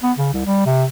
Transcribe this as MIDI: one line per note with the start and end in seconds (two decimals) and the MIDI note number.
0.03 0.12 59
0.18 0.29 49
0.33 0.43 36
0.46 0.63 55
0.66 0.84 48